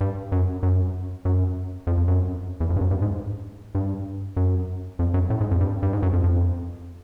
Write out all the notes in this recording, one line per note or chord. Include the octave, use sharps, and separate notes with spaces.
G2
F#2
F#2
F#2
F2
F2
F#2
E2
F2
G2
F#2
G2
G#2
G2
F#2
F2
F#2
A2
G#2
F2
G2
G2
G#2
F#2
F2
F2